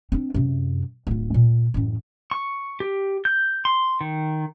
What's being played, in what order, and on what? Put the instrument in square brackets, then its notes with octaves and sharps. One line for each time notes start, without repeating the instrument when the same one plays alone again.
[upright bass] C4 D4
F#2 C3
D1 F4
A#2
A1 F#2
[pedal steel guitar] C#6
G4
G6
C6
D#3